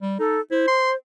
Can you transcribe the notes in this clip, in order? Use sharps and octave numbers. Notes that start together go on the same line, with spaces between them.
G3
D#4 A4
E4 C5
C6